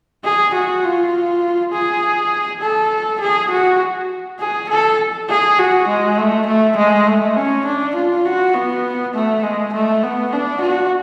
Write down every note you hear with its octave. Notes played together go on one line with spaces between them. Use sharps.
G#4
F#4
F4
G#4
A4
G#4
F#4
G#4
A4
G#4
F#4
G#3
A3
A3
G#3
A3
C#4
D4
F4
F#4
B3
A3
G#3
A3
B3
D4
F#4